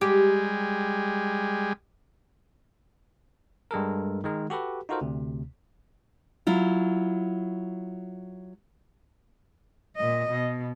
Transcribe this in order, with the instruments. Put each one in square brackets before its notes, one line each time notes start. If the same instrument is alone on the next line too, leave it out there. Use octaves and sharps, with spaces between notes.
[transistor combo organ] G3 G#3 [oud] G4
[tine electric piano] G2 G#3 A4 A#4
D#3 G#3 A#4
F#4 G4 A4 B4
D#4 F4 F#4 A4 A#4 C5
D2 C3
[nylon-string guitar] F#3 E4 F4
[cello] A#2 D#5
B2